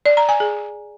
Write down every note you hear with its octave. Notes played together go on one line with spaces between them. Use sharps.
D5
A#5
G#5
G#4